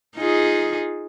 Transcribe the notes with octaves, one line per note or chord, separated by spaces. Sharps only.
D#4 F4 G#4